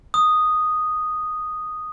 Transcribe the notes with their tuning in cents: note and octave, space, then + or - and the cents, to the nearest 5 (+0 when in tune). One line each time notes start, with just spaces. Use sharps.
D#6 -5